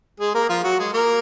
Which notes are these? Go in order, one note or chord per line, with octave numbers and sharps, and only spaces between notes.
G#3 G#4
A#3 A#4
F3 F4
F#3 F#4
G#3 G#4
A#3 A#4